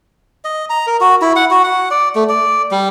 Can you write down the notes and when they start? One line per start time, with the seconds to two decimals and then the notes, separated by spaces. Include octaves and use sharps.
0.45 D#5
0.70 A#5
0.87 A#4
1.01 F#4
1.22 E4
1.36 F#5
1.51 F#4
1.64 F#5
1.91 D5
2.15 A3
2.29 D5
2.71 G3